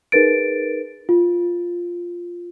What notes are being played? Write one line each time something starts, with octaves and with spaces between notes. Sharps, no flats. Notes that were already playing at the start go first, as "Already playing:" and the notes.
D#4 G#4 A#4 B4 A6 D7
F4